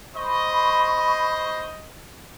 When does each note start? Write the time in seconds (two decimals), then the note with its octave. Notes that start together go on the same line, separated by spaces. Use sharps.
0.16 C5 D#5 B5 C#6